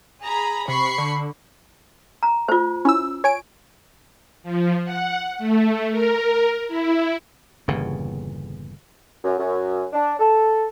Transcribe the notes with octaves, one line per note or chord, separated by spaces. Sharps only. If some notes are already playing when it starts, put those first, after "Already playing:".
G#4 A#5 B5
C3 B5 C#6 C7
D3
A#5
A3 F4 C5
C#4 E4 E6
C#5 G#5 D7
F3
F#5
A3
A#4
E4
G1 E2 A#2 C#3
F#2
F#2
D4
A4